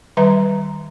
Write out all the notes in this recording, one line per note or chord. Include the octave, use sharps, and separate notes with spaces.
D#3 G3 B4 E5 A#5